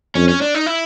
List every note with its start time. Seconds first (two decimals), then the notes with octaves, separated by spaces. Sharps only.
0.15 F2 C#4
0.28 C#4
0.42 D4
0.55 D#4
0.66 E4